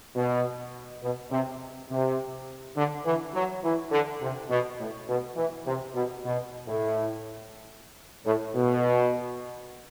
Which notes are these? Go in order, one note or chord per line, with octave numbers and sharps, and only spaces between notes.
B2
B2
C3
C3
D3
E3
F#3
E3
D3
C3
B2
A2
B2
E3
C3
B2
B2
A2
A2
B2